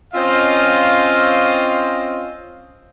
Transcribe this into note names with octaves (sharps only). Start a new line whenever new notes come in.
C4 C#4 F4 C5 D#5 F5